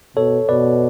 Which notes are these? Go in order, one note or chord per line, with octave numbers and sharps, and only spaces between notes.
B2 A4 C#5
B2 B4 D5